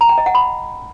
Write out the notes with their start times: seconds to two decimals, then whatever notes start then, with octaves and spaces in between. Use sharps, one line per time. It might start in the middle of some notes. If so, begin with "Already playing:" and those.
0.01 A#5
0.09 G5
0.18 D#5
0.26 F#5
0.35 B5